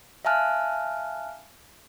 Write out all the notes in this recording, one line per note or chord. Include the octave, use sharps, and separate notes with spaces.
E5 F5 G#5 A5 F6 F#6